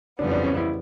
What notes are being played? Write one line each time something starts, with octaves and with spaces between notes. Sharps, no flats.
F2 C#3 E3 G3 B3 D4
D4
C#4
E4